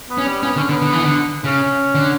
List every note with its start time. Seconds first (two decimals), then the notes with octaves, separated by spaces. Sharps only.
0.10 B3
0.18 C#4
0.26 G3
0.43 B3 C#4
0.56 D3 C#4
0.69 D3 B3
0.81 D3
0.93 E3
1.05 D3
1.44 C#3 C#4
1.95 D3